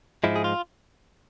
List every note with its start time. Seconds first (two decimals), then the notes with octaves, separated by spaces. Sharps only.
0.24 G#2 F3 G#3 E4
0.36 G#4
0.44 F4